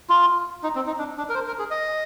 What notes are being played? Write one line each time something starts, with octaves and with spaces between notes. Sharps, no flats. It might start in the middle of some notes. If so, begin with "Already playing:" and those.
F4
D#4
C4
D#4
D4
D4
A#4
C5
A#4
G#4
D#5